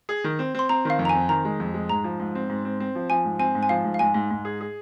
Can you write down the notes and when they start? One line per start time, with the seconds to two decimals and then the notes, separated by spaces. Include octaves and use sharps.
0.09 G#4
0.24 D#3
0.39 C4
0.55 C4 C6
0.69 C4 A#5
0.85 D#3 F5
0.99 F2
1.05 A#5
1.09 G#5
1.15 C4
1.29 D#3 A#5
1.45 G#3
1.60 F2
1.74 G#3
1.89 G#2 A#5
2.04 F3
2.20 G#2
2.35 C4
2.50 G#2
2.65 C4
2.80 C4
2.95 F3
3.10 F3 G#5
3.24 G#2
3.39 C4 G#5
3.55 G#2
3.63 G#5
3.69 F3 F5
3.84 G#2
3.94 F5
3.99 G#2 G#5
4.14 G#2
4.31 G#2
4.45 G#4
4.61 G#4